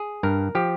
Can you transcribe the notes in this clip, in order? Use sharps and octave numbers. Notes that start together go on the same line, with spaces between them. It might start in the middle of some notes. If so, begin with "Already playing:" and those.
Already playing: G#4
G2 A#4
F3 G4